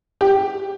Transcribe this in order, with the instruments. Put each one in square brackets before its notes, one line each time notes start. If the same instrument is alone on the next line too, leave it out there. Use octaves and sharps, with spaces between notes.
[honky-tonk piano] G4